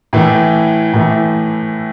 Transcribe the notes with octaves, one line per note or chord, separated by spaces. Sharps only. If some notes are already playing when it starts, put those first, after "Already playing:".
A2 E3 A3
A2 E3 A3